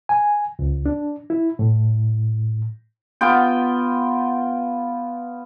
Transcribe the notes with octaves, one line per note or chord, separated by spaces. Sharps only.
G#5
C#2
D4
E4
A2
B3 F4 G5